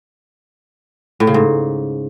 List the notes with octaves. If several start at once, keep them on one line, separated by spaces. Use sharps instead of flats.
A2
C#3
G#2